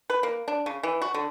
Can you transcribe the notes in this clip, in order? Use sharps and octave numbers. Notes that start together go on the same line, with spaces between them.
B4
A#3
D4
C#3
E3
F#4
D3